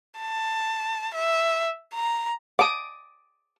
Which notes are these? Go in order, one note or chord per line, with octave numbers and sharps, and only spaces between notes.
A5
E5
A#5
F#5 A5 D6 D#6